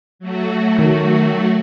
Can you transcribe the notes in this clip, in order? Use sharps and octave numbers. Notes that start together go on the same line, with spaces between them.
F#3 A3 F#4
D#3